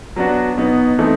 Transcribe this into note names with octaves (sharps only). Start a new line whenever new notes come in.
F#3 B3 D4 F#4
B2 F#3 B3 D#4
E3 A3 C4 D#4